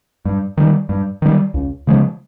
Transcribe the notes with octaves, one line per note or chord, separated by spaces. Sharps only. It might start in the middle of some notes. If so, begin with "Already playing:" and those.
G2
D#3 G3
G2
D#3 G3
C#2
C#3 F3 G#3